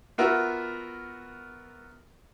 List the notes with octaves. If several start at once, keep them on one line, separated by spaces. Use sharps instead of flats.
B3 F4 F#4 A#4 E5